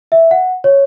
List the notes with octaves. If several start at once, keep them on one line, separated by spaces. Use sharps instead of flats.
E5
F#5
C#5